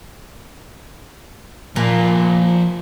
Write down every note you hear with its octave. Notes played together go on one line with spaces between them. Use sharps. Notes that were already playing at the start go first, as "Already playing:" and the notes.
A#2 F3 G#5